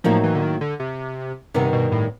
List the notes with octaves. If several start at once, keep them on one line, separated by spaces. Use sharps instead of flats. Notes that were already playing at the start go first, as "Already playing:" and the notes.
A2 F3 F#3 A#3 D#4
E3
D3
D#3
D3
C3
G2 C3 D#3 G3 B3
B2
A2